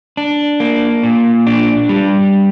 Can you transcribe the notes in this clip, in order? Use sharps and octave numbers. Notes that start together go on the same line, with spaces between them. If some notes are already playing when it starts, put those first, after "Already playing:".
D4
A#3
A#2
D4
G3